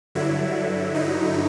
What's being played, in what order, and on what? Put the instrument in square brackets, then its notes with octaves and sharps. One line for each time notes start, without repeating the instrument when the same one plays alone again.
[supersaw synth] G2 D3 F#3 E4
D#4